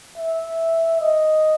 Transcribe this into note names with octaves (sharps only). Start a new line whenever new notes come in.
E5
D#5